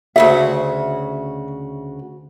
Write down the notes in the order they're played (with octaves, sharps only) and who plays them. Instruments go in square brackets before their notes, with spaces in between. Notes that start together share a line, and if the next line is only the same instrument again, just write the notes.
[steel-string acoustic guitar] D2 C#3 F#4 [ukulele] E5